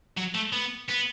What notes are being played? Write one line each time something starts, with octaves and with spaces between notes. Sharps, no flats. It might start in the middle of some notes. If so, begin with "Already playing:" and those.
F#3
A3
B3
B3